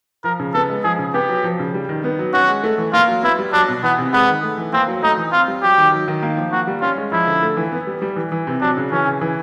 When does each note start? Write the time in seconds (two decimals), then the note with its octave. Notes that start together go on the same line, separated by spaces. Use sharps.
0.24 F3 A#4
0.40 C#3
0.54 B3 A4
0.69 G#3
0.84 F3 G#4
0.99 C#3
1.14 B3 G4
1.29 F#3
1.44 F3
1.59 C#3
1.74 G3
1.89 D#3
2.04 B3
2.19 F#3
2.33 C#4 F#4
2.49 G#3
2.63 A3
2.78 E3
2.93 A#3 F4
3.08 F#3
3.23 B3 E4
3.39 G3
3.53 F#3 D4
3.68 B2
3.83 E3 B3
3.98 C3
4.13 G#3 B3
4.28 D#3
4.43 A3
4.58 E3
4.73 A#3 C4
4.88 F#3
5.03 A3 D#4
5.17 E3
5.32 C4 F4
5.48 G3
5.63 F#3 G4
5.78 D#3
5.92 F#3
6.08 D#3
6.23 A#3
6.37 F3
6.52 A#3 F#4
6.67 G3
6.82 C#4 F4
6.97 G#3
7.12 F3 E4
7.27 D3
7.43 A3
7.57 E3
7.72 B3
7.87 G3
8.02 G3
8.16 E3
8.32 E3
8.47 C3
8.61 F#3 D4
8.77 C#3
8.91 E3 C#4
9.06 C#3
9.21 E3